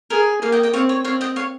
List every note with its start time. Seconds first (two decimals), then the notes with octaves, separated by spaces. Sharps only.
0.10 G#4 A#4
0.42 A#3 F5 G#5
0.52 D#5 G5
0.63 D#5 G5
0.73 C4 C#5 F5
0.89 C#5
1.04 C4 C#5 F5
1.21 D#5 G5
1.36 C#5 F5